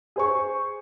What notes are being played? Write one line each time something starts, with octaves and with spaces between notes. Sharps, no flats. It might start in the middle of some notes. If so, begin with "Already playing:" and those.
G#4 C5 C#6